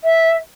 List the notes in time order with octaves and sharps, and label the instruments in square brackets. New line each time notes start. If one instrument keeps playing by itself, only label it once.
[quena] E5